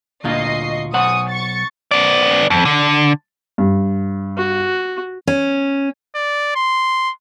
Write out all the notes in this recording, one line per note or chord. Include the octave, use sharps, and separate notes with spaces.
D2 A#2 F4 D#5 C#6 C7
B1 C5 F#5 G#5 C#6 D#6
C#6 A6 C#7
B3 D5
F2
D3
G2
F#4
C#4
D5
C6